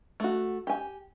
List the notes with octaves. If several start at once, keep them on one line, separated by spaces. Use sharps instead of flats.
A3 F#4
G4 G#5